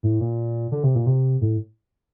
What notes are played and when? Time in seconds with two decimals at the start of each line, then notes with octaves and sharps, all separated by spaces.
0.03 A2
0.20 A#2
0.72 D3
0.83 C3
0.95 A#2
1.06 C3
1.41 A2